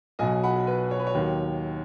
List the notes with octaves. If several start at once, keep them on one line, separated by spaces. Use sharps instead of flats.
B1 B2 F#3 D#5 G#5
F#5 B5
B4
C#5
B4
C#5
D#2 D#3 F#3